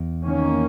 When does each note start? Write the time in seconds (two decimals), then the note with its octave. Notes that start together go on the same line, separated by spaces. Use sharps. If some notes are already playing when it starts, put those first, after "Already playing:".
Already playing: E2
0.23 D#3 A#3 C#4